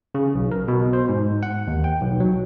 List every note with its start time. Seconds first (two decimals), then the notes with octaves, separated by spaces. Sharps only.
0.15 C#3
0.35 B1
0.52 A#4
0.68 B2
0.93 C5
1.09 G#2
1.43 F#5
1.67 D#2
1.84 G5
2.01 B1
2.20 F#3